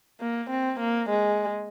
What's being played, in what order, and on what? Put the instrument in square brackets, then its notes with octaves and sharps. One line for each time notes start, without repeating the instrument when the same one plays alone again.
[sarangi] A#3
C4
A#3
G#3